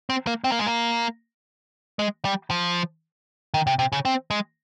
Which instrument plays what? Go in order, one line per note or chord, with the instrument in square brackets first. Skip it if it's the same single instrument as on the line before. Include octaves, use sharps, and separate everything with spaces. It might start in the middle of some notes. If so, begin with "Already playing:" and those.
[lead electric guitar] C4
A#3
C4
A#3
G#3
A#3
G#3
G3
F3
D#3
C3
C3
C#3
C4
G#3